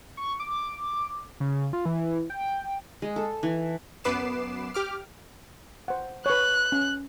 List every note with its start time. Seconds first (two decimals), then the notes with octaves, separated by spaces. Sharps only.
0.17 C#6
0.40 D6
1.40 C#3
1.73 F4
1.86 E3
2.30 G5
3.02 G#3
3.16 A4
3.43 E3
4.04 F#2 B3 B4 D6 C7 E7
4.74 G4 D6 F6
5.88 C5 F#5
6.26 B4 C#5 F#6
6.72 C#4